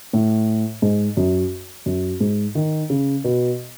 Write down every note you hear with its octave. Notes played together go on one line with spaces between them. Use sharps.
A2
G#2
F#2
F#2
G#2
D#3
C#3
B2